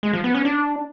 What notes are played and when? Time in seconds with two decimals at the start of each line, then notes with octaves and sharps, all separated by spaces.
0.03 G#3
0.13 F3
0.24 B3
0.34 C#4
0.45 D4